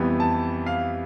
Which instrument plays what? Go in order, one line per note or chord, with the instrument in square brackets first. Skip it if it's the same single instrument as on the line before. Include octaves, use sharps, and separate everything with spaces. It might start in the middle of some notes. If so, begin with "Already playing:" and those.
Already playing: [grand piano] F2 E3 G3 B3
A5
F5